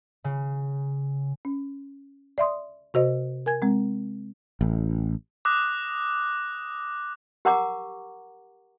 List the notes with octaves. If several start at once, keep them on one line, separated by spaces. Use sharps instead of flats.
C#3
C#4
D5 E5 C6 D#6
C3 F#4 C5 D#5
A#4 G#5 G#6
G#3 C4
A1
D6 D#6 F#6 A#6
G4 A#4 F#5 A#5 C#6 D6